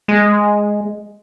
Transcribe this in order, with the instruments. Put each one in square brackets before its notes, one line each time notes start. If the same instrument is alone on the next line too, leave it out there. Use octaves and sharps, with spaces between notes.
[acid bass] G#3